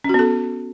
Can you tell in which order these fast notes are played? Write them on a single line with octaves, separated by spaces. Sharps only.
C#4 F#4 B3 A4